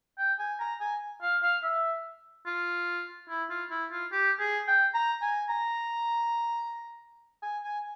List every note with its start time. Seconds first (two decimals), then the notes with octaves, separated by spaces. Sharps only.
0.18 G5
0.39 G#5
0.60 A#5
0.81 G#5
1.22 F5
1.43 F5
1.63 E5
2.46 F4
3.29 E4
3.50 F4
3.71 E4
3.91 F4
4.12 G4
4.39 G#4
4.67 G5
4.94 A#5
5.22 G#5
5.49 A#5
7.43 G#5
7.64 G#5